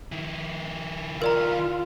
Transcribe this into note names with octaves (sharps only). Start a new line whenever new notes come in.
D#3 E4
F4 A#4 D5 A#5